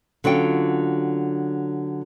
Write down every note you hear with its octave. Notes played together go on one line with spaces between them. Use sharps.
D3 F#3 C#4 F4 G5